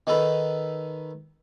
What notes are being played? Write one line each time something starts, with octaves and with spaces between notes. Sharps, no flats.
D#3 D#4 A4 B4 B5